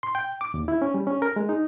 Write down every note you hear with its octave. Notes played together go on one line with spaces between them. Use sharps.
C6
G5
D6
D#2
E4
C#4
G3
C#4
A#4
G#3
D#4